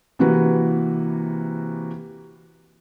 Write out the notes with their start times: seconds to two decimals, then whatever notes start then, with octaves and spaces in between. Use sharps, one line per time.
0.19 C3 E3 A#3 F#4 B4